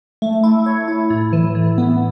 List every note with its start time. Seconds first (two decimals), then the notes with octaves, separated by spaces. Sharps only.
0.22 A3
0.43 E4
0.66 C#5
0.88 E4
1.10 A2
1.33 E3
1.55 A2
1.78 B3